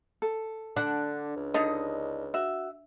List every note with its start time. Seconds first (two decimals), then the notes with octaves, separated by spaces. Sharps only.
0.22 A4
0.77 D3 D4 F#5
1.36 C#2
1.54 D3 D#4 D#5
2.34 F#4 E5